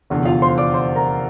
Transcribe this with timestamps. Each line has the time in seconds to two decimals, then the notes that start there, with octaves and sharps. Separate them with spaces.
0.10 F1 E2 D3
0.25 F4 F5
0.42 C5 C6
0.58 D5 D6
0.74 C5 C6
0.95 A#4 A#5